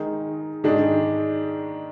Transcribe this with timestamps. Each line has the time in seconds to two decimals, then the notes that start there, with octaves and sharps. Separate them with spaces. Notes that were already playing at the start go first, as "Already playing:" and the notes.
Already playing: D#3 G#3 D#4 A#4
0.64 G#2 D#3 G#3 D4